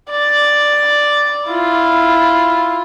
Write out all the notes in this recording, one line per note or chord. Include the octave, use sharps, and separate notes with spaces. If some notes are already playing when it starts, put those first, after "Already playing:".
D5
E4 F4